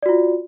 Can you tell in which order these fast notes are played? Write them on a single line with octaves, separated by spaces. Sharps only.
D5 F#4 F4